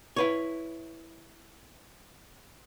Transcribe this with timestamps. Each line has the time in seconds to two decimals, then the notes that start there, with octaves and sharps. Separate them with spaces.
0.16 E4 B4 C#5